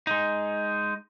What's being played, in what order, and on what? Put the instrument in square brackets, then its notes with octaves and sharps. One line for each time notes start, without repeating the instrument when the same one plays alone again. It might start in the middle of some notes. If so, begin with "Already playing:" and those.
[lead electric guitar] G#3 D#4